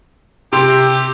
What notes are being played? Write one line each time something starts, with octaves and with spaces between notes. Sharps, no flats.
C3 G4 C6